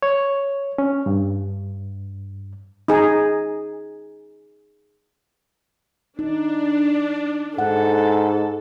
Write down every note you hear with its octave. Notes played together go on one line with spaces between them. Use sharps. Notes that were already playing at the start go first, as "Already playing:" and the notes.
C#5
C#4
G2
D#4 G#4
D4 D#4
G#2 A4 F#5